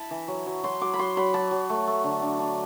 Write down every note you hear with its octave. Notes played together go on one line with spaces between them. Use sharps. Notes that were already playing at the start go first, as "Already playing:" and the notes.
Already playing: E4 A5 B5
E3
F#3
F#3
F#3 C6
F#3 D6
B5
F#3 C6
F#3 B5
F#3 A5
F#3
A3
A3
D3
D4
D4